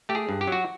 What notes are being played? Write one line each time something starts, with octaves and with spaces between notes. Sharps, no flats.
A3 G4
G#4
G2
G4
F#3 F#4